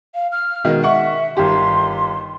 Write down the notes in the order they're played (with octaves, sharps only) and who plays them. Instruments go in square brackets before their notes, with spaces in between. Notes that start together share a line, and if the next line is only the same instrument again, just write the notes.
[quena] F5
F6
[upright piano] B2 D#3 G#3
[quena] E5 [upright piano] F#5 C#6
[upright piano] G1 D#3 G4 [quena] C6